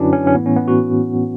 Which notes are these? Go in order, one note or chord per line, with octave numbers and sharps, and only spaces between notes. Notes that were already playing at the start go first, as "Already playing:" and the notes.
Already playing: F#2 D3 F#3 C#4 D4 E4 F#4 B4
C#4
C#4
A2 E3 B3
C#4
B3
F#4